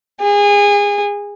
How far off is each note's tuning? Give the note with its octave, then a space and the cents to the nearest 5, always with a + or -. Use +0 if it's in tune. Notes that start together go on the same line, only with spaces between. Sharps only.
G#4 -25